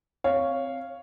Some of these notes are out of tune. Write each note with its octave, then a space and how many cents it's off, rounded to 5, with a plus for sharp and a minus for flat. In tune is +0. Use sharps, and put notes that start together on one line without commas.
C4 +0 C#5 +0 F5 -5